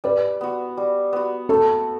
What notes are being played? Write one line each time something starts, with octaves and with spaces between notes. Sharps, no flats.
G3 B4
B3 F#4
G3
B3 F#4
A3 A4